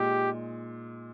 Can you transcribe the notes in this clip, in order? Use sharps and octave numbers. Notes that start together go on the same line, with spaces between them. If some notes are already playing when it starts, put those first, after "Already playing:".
Already playing: A#2 G#3 D#4 G4